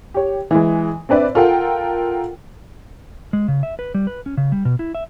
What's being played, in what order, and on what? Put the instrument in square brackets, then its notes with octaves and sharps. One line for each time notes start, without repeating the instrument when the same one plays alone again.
[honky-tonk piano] G4 C#5
E3 G#3
C4 D4 B4 D5 E5
F4 A4 A#4 F#5 G5
[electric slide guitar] G#3
C#3
E5
B4
G3
B4
C#4
C#3
G3
B2
E4
E5